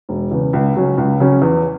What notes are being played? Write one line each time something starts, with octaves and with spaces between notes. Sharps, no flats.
E1
E2 C#3
C#2
C#3 F#3 C#4
C#2
C#3 F#3 C#4
E2